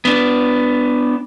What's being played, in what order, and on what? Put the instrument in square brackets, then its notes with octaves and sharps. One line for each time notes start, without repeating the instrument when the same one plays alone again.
[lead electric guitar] B3 D4